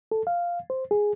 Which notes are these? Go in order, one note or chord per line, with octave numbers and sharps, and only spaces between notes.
A4
F5
C5
G#4